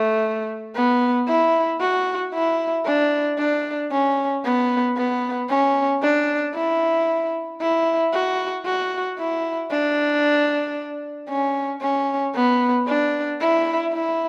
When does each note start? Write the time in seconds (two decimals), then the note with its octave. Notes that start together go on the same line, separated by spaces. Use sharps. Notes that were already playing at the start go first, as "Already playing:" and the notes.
Already playing: A3
0.75 B3
1.28 E4
1.80 F#4
2.34 E4
2.85 D4
3.39 D4
3.92 C#4
4.44 B3
4.97 B3
5.50 C#4
6.02 D4
6.54 E4
7.61 E4
8.13 F#4
8.65 F#4
9.18 E4
9.71 D4
11.29 C#4
11.81 C#4
12.35 B3
12.87 D4
13.41 E4
13.93 E4